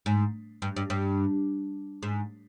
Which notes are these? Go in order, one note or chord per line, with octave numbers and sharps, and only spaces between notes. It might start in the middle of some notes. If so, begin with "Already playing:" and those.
G#2
G2
G2
G2
G#2